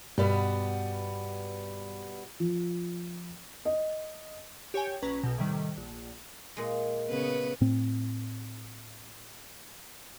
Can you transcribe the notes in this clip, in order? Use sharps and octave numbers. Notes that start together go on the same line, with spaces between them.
G2 B2 G3 B3
F3
D#5
G4 C#5 G5 G#5
A#1 C#4 B4 A#5
B1 B2
A2 C3 D#3 G3
A#1
A#2 G#3
C#3 B3 B4
A2 C4